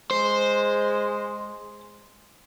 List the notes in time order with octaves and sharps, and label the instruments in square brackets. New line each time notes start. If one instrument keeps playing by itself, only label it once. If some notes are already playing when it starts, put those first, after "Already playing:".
[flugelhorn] G#3 [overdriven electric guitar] C5